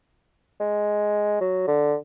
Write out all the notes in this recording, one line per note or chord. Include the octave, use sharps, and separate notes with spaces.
G#3
F#3
D3